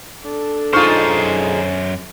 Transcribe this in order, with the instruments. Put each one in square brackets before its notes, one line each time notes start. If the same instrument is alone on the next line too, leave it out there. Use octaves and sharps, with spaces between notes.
[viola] D4 A4
[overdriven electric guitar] F#2 C5 [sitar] G#3 D#4 F4 [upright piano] C#6 F6